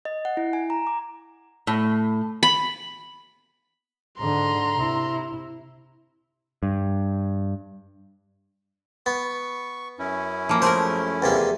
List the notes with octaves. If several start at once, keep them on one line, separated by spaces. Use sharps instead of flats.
D#5
F#5
E4
G#5
A#5
D6
A2
B5
G#2 D3 A#5 C6
C3 E4
G2
B3 C#6
F#2 C#4 E4
F3 A#3
A3 G#4 A#4 C5 C6
E2 C3 A#3